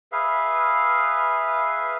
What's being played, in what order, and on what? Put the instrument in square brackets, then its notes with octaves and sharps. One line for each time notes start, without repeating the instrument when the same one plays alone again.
[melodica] G#4 B4 E5 F5